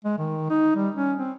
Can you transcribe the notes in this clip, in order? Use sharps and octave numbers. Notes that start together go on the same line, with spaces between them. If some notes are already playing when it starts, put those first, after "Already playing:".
G#3
D#3
D#4
G3
C#4
C4